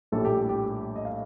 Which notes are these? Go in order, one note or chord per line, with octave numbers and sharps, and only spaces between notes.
A#1 A2 G3 A4
G4
G4
D#5
F5